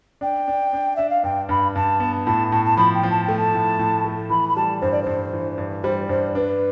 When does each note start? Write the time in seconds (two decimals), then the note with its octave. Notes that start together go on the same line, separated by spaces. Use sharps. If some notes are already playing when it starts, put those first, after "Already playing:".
0.21 D4 G5
0.48 D4
0.73 D4
0.96 D4 E5
1.10 F5
1.24 G2 G5
1.49 G2 B5
1.76 G2 A5
2.00 B3
2.26 A2 A5
2.51 A2 A5
2.65 A5
2.77 F3 B5
2.94 G5
3.03 F3
3.11 A5
3.24 A3 G5
3.38 A5
3.54 A2
3.79 A2
4.05 A3
4.30 E3 B5
4.48 B5
4.56 G3 A5
4.81 G2 C5
4.92 D5
5.03 G2 C5
5.33 E3
5.58 G2
5.84 G3 C5
6.09 G2 C5
6.35 D4 B4